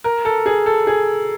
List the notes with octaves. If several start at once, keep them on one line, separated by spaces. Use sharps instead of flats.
A#4
A4
G#4
A4
G#4